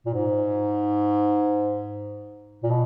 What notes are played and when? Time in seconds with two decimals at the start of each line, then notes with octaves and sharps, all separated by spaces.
0.06 A#2
0.13 G#2
2.63 A#2
2.70 B2